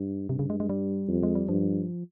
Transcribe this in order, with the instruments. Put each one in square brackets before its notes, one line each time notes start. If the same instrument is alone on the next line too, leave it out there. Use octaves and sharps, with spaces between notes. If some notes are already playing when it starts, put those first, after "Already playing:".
Already playing: [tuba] G2
[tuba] G2 [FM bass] C3
[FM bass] C#3
G#3
G#3
G3
[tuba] F2
[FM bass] G#3
G3
[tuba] G2 [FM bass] F3